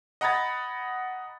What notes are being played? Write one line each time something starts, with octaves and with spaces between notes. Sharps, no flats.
D#5 F#5 A#5 B5 G#6 A6